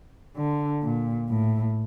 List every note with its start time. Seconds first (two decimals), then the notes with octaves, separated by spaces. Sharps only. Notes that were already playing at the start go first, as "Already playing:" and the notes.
0.37 D3
0.83 A#2
1.30 A2